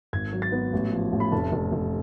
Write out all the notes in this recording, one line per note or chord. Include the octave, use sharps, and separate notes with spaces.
G#1 G#6
F#3
A6
B3
A1
F3
A1
B5
F1 A5
F1
F1